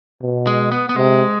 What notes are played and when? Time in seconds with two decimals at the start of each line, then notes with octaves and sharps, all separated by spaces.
0.22 B2
0.47 G#3
0.72 B3
0.89 B3
0.96 C3 G#3